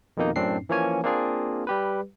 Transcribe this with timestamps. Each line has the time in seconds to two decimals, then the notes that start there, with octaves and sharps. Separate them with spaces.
0.17 F2 B2 D#3 A#3 D#4
0.36 F#2 A2 C4 D4 C7
0.69 E3 F3 A#3 C#4 C#5 G#5
1.03 A#3 C4 D4 F4 G#4
1.67 G3 G4 B4